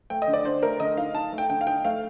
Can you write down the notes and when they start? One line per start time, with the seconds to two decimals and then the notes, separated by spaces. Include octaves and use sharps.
0.10 A3 G5
0.22 D#5
0.28 D3
0.33 D5
0.45 D4 C5
0.63 A3 A#4
0.80 D3 D#5
0.97 D#4 F5
1.15 D#4 A5
1.32 A3
1.38 G5
1.49 D3 G5
1.61 F5
1.67 D#4 G5
1.85 A3 F5